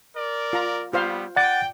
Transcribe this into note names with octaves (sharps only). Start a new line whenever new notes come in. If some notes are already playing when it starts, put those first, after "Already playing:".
A#4 D5
F4 A#5
G3 B3 F4 C5 F5
D5 F#5 G5 A6